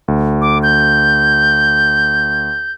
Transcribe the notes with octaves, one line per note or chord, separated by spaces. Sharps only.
D2
D6
G6